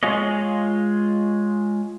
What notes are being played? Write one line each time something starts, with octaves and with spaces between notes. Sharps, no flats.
G#3 F4 G#4 C#5 D#5